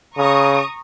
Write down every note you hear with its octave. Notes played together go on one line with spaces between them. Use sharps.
C#3 A#5 C#6 D#6